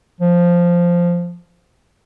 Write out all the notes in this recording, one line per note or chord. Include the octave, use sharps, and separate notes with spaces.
F3